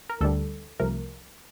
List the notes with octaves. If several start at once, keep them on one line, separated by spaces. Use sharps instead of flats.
A#4
D2 D3 G3 A4
C2 C3 F3 A3 A#4